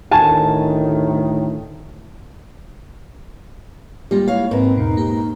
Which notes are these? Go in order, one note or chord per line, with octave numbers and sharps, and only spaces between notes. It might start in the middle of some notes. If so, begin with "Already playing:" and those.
D2 A2 D#3 G#5 A5
G3 G#3 A#3 F4 G4
E4 C#5 F5
G#2 C4 A#4 B4
E2 B2 D#4
A#3 G4